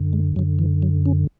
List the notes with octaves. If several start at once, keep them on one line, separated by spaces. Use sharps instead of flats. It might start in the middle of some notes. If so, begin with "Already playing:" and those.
Already playing: F#2 D3
G#3
F#2 D3 F#3
E3
F#3
C#4